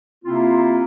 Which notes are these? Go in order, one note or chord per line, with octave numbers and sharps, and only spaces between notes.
C3 A#3 C4 E4 F4